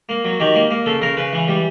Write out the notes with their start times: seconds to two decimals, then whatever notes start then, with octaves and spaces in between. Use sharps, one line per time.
0.09 A#3
0.25 F#3
0.40 D#3 G4
0.55 A#3
0.70 A#3
0.86 C#3 A4
1.02 C#3 A#4
1.17 C#3 B4
1.33 E3
1.48 G3